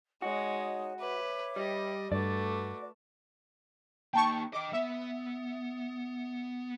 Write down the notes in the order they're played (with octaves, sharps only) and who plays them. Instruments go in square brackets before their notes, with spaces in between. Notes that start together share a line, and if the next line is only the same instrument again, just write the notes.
[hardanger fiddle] G#3 [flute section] D#4 C#5 D#5 [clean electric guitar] F#4
[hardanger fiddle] B4 [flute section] C#5 E5 D6
[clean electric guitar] G3 [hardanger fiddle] D#5
[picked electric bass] G2 [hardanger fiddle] A3 [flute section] F#4 B4 D6 [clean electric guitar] D5
[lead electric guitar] A#3 D#4 [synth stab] G5 A5 C#6
[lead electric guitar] D#5 G5 [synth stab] D6
[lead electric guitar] B3 [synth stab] E5